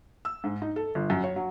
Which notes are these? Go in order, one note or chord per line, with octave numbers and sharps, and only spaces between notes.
E6
G#2
D#4
A4
G1
F#2
C#5
F#3